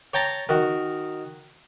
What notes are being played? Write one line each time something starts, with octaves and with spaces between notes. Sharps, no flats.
C#5 G5 A5 A#5
D#3 F#4